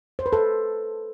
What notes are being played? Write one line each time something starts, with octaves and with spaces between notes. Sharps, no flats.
C5
B4
A4